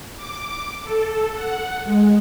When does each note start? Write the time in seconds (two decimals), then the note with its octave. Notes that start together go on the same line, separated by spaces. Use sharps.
0.17 D6
0.82 A4
1.34 F#5
1.85 G#3